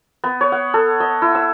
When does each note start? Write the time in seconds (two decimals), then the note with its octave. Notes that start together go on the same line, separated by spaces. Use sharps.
0.24 B3
0.41 C#5
0.52 F#5
0.74 A4
1.00 D#5
1.22 E4
1.35 E6